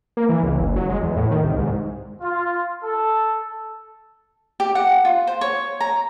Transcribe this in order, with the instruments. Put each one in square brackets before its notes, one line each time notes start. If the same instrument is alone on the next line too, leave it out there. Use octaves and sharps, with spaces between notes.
[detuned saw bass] A#3
E3
C#2
F#1
F#3
G#3
E2
A2
D#3
C2
G#2
[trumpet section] F4
A4
[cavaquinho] G4
F#5
F4
C5
C#5
A#5